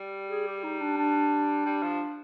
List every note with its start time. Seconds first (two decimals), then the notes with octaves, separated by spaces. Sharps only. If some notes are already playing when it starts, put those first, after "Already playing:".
Already playing: G3
0.29 G#4
0.47 G4
0.63 D#4
0.81 D4
0.98 D4
1.65 G3
1.83 F3